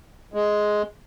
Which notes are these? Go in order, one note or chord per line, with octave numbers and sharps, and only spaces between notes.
G#3